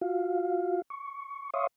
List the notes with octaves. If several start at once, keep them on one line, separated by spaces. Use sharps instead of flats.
F4 F#4 F5
C#6
C#5 E5 F5 C6 C#6 D#6